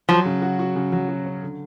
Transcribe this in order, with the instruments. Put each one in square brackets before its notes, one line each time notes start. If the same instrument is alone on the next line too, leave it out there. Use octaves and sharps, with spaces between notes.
[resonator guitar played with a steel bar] F3 [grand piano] F#3
[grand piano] C#3
F#4
F#4
C#3
F#3
F#4
C#4
D3